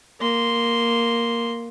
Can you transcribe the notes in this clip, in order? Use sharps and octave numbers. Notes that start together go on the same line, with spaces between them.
A#3 C6